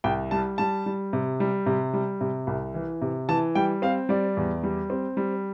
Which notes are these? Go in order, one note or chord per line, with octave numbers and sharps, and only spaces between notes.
C2 G5
G3 A5
G3 A5
G3
C3
G3
C3
G3
C3
C2
E3
C3
E3 A5
G3 G5
C4 F5
G3 D5
E2
G3
C4
G3